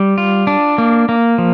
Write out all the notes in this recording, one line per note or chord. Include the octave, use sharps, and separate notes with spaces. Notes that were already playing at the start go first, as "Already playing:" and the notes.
Already playing: G3
F4
D4
A#3
A#3
F3